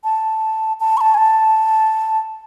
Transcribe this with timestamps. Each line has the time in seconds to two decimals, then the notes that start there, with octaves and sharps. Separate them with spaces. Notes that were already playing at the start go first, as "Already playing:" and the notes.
0.04 A5
0.80 A5
0.97 C#6
1.01 A5
1.14 G#5
1.18 A5